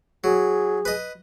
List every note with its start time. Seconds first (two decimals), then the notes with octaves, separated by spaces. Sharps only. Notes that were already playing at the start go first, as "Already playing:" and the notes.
0.24 F#3 G#4
0.85 B4 D#5